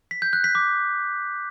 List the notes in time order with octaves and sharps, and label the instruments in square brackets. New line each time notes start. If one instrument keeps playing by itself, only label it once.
[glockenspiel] B6
G6
F#6
B6
D6